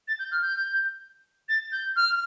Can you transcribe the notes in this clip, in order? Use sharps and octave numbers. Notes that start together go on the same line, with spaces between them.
A6
G6
F6
G6
A6
G6
F6